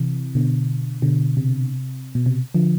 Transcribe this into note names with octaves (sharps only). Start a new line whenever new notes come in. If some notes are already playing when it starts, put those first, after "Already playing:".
Already playing: C3 E3
B2 D3
B2 D3
C3
B2
C3
D3 F3